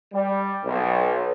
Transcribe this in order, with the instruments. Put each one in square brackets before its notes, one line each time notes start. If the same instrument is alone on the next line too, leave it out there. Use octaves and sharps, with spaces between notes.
[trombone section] G3
B1